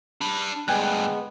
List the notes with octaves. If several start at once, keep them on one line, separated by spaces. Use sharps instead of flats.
D4 B5
D2 G2 G#3 B3 G5 G#5 F#6